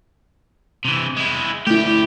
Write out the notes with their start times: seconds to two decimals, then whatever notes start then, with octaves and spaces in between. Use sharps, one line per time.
0.85 C3 E3
1.17 G#3 E4
1.67 D2 A3 E4 G4